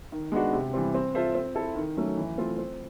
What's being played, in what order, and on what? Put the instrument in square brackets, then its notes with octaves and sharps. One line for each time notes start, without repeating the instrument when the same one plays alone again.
[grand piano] D#3
G#3 B3 D4 F#4
C3
E3 G3 C4
C4
F4 A4 C5 E5
C4
E4 A4
D#3
F#3 A3 C#4
E3
A3 C4 F4
C4